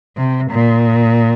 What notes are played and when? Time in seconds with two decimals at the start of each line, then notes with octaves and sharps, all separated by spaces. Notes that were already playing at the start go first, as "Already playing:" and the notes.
0.17 C3
0.52 A#2